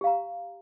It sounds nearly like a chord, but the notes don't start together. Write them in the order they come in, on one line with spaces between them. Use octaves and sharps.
G4 F5 A#5